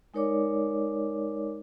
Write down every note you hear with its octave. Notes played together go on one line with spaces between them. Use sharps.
G#3 D#4 A#4 C#5 D5 D6